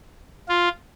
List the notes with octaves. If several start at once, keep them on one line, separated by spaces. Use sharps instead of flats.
F4